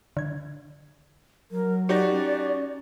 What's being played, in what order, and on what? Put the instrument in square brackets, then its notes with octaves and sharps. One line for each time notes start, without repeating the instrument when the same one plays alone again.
[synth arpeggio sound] D3 G#6
[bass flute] F#3 [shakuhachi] A#4
[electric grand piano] D#4 F#4 G4 [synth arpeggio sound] C#5 G6 A#6 [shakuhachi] D5
[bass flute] C#4